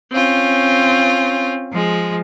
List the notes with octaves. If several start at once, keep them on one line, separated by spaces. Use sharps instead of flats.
C4 C#4 F4
F3 G#3